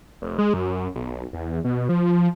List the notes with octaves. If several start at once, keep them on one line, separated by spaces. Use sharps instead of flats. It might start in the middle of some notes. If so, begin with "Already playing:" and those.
F1
G#3
F#2
B1
E2
B2
F3